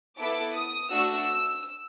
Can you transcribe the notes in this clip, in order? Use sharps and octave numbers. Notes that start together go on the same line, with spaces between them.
B3 E4 A4 D6
D#6
A3 D4 F#4 E6